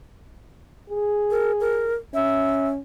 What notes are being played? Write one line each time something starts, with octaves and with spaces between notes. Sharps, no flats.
G#4
A#4
A#4
C#4 E5